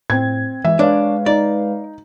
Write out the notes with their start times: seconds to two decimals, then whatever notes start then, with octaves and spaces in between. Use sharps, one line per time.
0.10 A2 C4 G#6
0.65 E3 G#3 E5
0.79 G#3 D4 B4 C#5 F5
1.26 D#4 D5